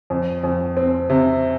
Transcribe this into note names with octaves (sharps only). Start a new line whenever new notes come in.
F2
F2
C4
C3